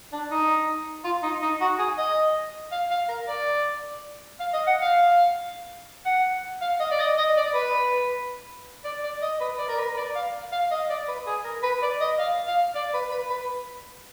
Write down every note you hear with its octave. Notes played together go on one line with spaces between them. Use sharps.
D4
D#4
F4
D#4
D#4
F#4
G#4
D#5
F5
F5
A#4
D5
F5
D#5
F#5
F5
F#5
F5
D#5
D5
D#5
D#5
D5
B4
D5
D5
D#5
B4
D5
A#4
B4
D5
F5
F5
D#5
D5
B4
G#4
A#4
B4
D5
D#5
F5
F5
D5
B4
B4
B4